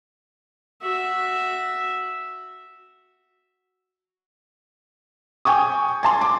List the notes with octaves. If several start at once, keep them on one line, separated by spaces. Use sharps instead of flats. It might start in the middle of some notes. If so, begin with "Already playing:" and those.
F#4 E5
G5 G#5 C#6 D#6
G#5 A5 C6
D6